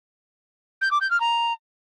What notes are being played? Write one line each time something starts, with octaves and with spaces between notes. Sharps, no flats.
G6
D6
G6
F6
A#5